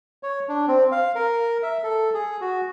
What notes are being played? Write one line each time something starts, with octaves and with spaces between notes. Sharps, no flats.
C#5
D4
C4
F5
A#4
E5
A4
G#4
F#4